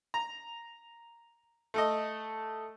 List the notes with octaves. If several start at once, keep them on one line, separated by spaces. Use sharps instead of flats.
A#5
A3 A4 D#5